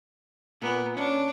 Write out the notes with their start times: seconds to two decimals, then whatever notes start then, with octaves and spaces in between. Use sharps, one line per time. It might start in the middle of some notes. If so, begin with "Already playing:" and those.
0.62 A#2 B3 A#4
0.97 C#4 D4